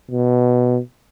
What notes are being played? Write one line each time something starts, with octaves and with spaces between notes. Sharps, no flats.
B2